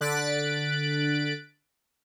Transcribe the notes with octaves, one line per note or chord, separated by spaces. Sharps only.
D3 F#6 A6 B6 D7